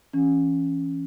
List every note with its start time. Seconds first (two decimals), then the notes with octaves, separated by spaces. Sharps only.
0.13 E3 C#4